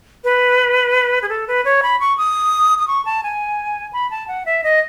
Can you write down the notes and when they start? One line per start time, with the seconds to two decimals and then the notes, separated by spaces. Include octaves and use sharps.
0.24 B4
1.22 G#4
1.29 A4
1.48 B4
1.65 C#5
1.83 B5
2.00 C#6
2.18 D#6
2.79 D#6
2.88 C#6
3.05 A5
3.23 G#5
3.93 B5
4.11 A5
4.28 F#5
4.46 E5
4.64 D#5